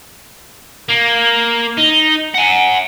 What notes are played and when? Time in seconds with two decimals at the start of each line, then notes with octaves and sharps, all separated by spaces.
0.89 A#3
1.77 D#4
2.34 F#5 G#5